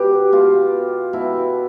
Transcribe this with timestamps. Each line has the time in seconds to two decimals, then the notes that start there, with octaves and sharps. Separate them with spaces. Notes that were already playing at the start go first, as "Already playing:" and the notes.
Already playing: B2 G4 B4
0.32 B2 F4
1.13 B2 E4